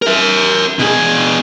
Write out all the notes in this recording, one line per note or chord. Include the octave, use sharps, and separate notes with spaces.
A#4 E5
B2 G#4